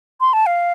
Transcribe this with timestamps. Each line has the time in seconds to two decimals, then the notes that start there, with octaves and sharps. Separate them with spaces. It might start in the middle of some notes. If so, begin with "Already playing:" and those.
0.21 C6
0.33 A5
0.46 F5